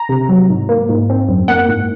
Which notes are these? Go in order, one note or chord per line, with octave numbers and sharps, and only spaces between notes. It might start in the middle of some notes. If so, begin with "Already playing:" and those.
Already playing: A#5
C3
F#3
G#2
A#3
G#2
C4
F#2
A#3 F#5
G#2